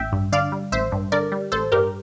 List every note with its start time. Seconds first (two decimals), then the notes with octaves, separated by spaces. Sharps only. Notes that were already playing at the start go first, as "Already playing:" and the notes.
Already playing: A1 E5 G5
0.12 G2
0.32 D3 D5 F5
0.52 G3
0.72 A1 C5 E5
0.92 G2
1.12 D3 A#4 D5
1.32 G3
1.52 A1 A4 C5
1.72 G2 G4 A#4